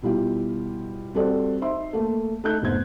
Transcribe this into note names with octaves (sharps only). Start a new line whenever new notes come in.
B2 G3 E4 F4 G4
G3 C4 F#4 A4 C5 D5
D#4 C5 E5 C6
A3 A#3
A3 D#4 F#6 G6
F1 G#2 B3 C5 G#6